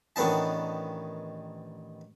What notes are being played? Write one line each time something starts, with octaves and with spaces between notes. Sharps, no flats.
A1 D#3 B3 D4 A5